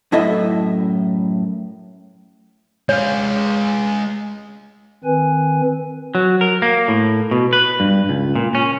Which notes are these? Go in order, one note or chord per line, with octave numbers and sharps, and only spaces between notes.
F#2 A2 E4 A4 D#5 E5
G#3 C#5 F5
D#3 C4 B4 G#5
F#3
A#4
A#3
A2
B2
B4
G2
C#2
A#2
C#4